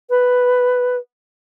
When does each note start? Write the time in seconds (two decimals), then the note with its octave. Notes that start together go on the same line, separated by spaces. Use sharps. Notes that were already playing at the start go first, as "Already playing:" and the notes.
0.10 B4